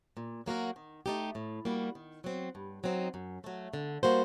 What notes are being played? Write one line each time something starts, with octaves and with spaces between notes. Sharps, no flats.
A#2
F#3 A#3 F#4 A#4
D#3
A3 D#4 G4
A2
G3 A#3 F#4
D#3
F#3 C4
G2
F#3 C4 D#4
F#2
F#3 A3
D3
G3 A#3 F#4 C5